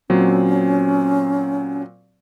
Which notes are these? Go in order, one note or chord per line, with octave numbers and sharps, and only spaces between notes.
A#2 F#3 C4 C#4